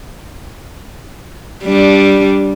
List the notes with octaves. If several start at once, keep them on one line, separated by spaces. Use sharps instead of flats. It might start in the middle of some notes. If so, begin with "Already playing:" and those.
G3 D4